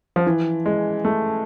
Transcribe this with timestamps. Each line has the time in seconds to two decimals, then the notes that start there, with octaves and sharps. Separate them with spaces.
0.16 F3
0.27 E3
0.66 G#3
1.05 A3